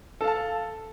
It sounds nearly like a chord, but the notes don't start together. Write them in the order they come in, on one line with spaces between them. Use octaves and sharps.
A4 F5 A5